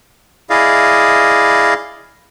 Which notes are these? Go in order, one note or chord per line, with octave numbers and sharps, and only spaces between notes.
E4 G#4 D5 D#5 F5